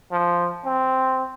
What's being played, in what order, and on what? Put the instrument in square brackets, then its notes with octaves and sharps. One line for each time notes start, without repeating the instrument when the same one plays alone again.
[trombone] F3
C4